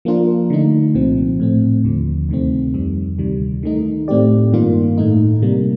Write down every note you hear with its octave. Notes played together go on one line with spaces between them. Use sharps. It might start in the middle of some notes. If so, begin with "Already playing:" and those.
F3 A#3 D4 F4 A#4
D3 A3 D#4
C2 A#2 F3 C4
A2 A3 C4
D#2 D3 F3
D2 C3 D#3 A3 C4
F2 D#3 G3
D2 C3 D#3 G3
D#3 A3 D#4
A2 A3 C4 G4 D5
G2 D#3 A#3 F4
A2 A3 D#4
C3 G3 A#3